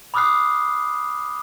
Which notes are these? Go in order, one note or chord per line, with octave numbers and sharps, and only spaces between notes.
B5 D6 D#6 F6 F#6 C7